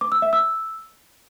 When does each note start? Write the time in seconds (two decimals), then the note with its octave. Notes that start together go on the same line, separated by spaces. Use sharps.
0.01 D6
0.12 E6
0.22 E5
0.33 E6